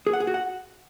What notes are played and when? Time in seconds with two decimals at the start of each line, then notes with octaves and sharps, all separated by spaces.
0.07 G#4
0.13 F#5
0.20 G#4
0.27 F#4
0.34 F#5